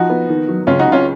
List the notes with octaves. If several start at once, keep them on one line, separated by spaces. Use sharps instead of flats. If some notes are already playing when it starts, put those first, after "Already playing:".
Already playing: F3 D#4 F#4
B3
D#3
F#3
C#2 C#4 F4
D#4 F#4
C#3
C#4 F4